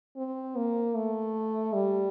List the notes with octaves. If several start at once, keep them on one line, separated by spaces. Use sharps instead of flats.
C4
A#3
A3
G3